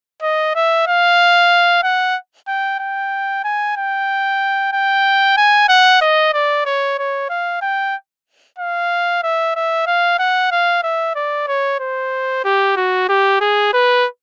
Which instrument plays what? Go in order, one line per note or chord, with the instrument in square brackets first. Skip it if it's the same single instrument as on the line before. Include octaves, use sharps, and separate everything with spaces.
[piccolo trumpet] D#5
E5
F5
F#5
G5
G5
G#5
G5
G5
G#5
F#5
D#5
D5
C#5
C#5
F5
G5
F5
E5
E5
F5
F#5
F5
E5
D5
C#5
C5
G4
F#4
G4
G#4
B4